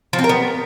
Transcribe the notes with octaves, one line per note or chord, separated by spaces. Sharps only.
F3
C4
A#4
B3